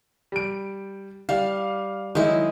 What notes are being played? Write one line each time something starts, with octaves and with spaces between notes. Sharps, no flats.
G3 D7
G3 F5
D#3 F#3 G#3 E4